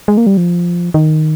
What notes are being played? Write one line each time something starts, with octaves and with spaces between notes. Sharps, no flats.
G#3
A#3
G3
F3
D#3